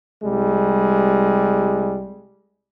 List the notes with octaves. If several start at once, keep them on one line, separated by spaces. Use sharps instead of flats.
C2 G3 G#3